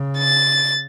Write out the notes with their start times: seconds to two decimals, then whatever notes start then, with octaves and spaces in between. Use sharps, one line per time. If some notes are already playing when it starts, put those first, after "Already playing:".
Already playing: C#3
0.18 A6